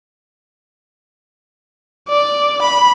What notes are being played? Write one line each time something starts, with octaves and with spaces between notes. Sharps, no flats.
D5
B5